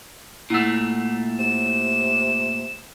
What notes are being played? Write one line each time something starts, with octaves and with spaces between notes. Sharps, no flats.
A#2 A3 E4 F#5 E6
C3 E7